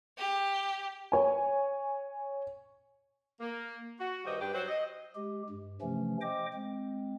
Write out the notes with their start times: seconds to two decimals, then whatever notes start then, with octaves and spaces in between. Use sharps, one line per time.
0.17 G4
1.12 C#5 G#5
3.40 A#3
4.00 F#4
4.24 G2 D#3 G3 G4 C5 D#5
4.40 G2 D4 G4
4.53 F#3 C5
4.68 D#5
5.15 G#3 G4
5.49 G2
5.81 C3 E3 F3 A3 C#4
6.21 C5 D#5 G5 D6
6.53 G#3 C4